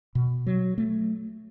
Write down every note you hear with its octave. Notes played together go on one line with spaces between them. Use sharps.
B2
F#3
A3